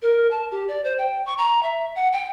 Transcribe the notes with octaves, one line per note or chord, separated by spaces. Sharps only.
A#4
A5
G4
D5
C5
G5
C#6
A#5
E5
F#5
G5